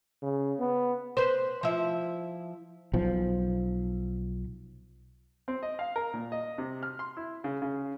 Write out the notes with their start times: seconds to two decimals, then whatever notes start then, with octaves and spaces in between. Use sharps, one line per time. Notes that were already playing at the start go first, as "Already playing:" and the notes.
0.23 C#3
0.60 B3
1.17 B4 C5
1.63 F3 E4
2.94 B1 F3
5.48 C4
5.63 D#5
5.79 F5
5.96 A#4
6.13 A#2
6.32 D#5
6.58 C3
6.83 F6
6.99 C6
7.17 E4
7.44 C#3
7.62 C#3